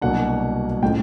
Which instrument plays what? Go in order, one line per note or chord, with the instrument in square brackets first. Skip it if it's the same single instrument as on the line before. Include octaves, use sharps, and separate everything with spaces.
[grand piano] C2 B2 F#3 A#3 D4 F#5
A2 F3 G#3 C#4 G5